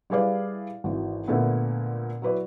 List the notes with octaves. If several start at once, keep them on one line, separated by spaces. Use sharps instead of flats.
G3 E4 G#4 B4 D5 F5
G#1 E3 F#4
A#2 D3 A3 B3
F#3 E4 B4 D5